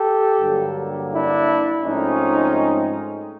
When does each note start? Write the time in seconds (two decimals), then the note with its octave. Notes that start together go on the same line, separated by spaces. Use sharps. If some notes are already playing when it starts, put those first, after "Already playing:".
Already playing: G4 A4
0.41 G2 D3 F#3 A#3
1.12 D4 E4
1.84 G#2 F3 A3 C4 C#4 D#4